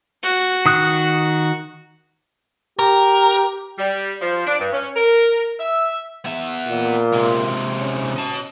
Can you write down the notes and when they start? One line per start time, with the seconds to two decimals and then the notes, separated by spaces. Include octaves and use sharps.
0.23 F#4
0.66 D#3 D#6 F#6
2.79 G4 A#4
3.79 G3
4.22 F3
4.47 D4
4.60 G2
4.73 C#4
4.96 A#4
5.59 E5
6.25 B3 E5
6.67 A#2
7.12 C3 G#3
7.79 C#4
8.16 D#5 A5